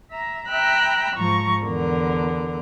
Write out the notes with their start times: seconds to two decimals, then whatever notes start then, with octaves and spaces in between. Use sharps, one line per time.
0.10 E5 A#5
0.49 E5 G5 A#5 B5 E6 F#6
1.15 G#2 F3 A#5 C#6
1.63 E2 D3 A#4